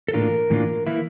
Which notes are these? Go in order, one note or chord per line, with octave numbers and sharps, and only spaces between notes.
A4
A2 E3 A#3 D4 F4 A#4
A2 E3 A#3 D4 F4
E3 A#3 E4